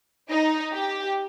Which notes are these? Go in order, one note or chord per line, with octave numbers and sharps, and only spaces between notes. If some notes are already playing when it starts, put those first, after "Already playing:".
D#4
G4